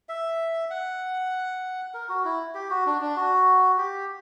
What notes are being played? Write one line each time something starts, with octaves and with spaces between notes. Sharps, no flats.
E5
F#5
A#4
F#4
E4
G4
F#4
D4
D4
F#4
G4